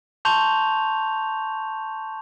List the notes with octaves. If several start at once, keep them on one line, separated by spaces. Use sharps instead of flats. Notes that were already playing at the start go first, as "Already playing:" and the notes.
A5 C6 C#6 G6 F7